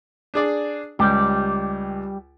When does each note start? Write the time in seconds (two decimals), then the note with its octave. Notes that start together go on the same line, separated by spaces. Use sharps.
0.34 D4 G#4 D5
0.99 C#2 G3 G4